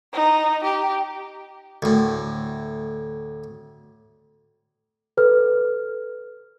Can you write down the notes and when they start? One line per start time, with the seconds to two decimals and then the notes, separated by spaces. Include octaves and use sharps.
0.13 D#4
0.64 G4
1.82 D2 A2
5.17 A4 B4 F6